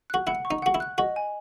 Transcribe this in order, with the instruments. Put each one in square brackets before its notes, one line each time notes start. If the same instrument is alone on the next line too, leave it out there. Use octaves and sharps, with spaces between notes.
[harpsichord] F#4 [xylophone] F#6
[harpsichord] E4 [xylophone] F#5
[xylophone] C#6
[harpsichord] D#4
[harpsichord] F#4 [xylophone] F#5
[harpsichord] E4
[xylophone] F#6
[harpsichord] F#4 [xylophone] D#5
[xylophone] G#5